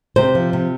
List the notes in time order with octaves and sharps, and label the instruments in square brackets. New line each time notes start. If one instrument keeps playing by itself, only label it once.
[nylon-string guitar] C3 C5
F3
C3